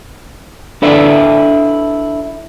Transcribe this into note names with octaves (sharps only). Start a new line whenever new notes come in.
D4 E4 A4 B4 D5 E5